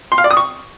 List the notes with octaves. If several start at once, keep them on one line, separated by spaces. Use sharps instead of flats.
C6
F5
D5
D#6
C#6